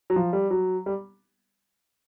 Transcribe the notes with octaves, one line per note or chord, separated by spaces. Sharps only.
F#3
F3
G3
F#3
G3